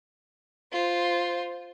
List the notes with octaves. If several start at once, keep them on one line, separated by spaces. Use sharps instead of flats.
F4 C5